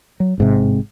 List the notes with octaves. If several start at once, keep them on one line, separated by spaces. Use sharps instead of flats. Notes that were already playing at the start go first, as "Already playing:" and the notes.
F#3
A1 G#2 C3